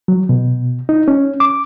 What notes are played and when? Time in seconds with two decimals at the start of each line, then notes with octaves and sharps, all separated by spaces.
0.08 F#3
0.29 B2
0.89 D#4
1.08 C#4
1.40 D6